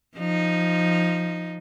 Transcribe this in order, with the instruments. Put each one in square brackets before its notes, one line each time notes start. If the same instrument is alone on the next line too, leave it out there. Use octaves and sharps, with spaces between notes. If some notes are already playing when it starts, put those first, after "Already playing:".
[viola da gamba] F3 D#4